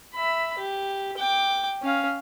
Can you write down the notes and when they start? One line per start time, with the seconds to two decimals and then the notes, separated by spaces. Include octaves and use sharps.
0.14 E5 B5
0.59 G4
1.17 G5 D6
1.83 C#4 F5